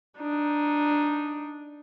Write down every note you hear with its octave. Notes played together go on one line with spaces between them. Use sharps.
D4 D#4